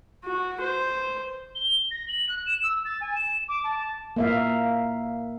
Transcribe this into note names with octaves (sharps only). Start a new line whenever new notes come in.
F#4
C5
G7
A#6
F#7
F#6
E7
E6
A6
G#5
E7
D6
A5
A#3 E5 F5